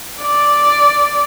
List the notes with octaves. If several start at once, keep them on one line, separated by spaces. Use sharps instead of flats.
D5